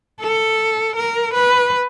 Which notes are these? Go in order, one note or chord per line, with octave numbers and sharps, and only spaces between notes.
A4
A#4
B4